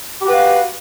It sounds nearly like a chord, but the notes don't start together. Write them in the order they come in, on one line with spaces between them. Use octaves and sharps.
G4 F#4 B4 F5